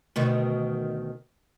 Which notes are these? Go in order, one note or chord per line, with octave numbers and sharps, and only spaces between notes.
D2 B2 D#3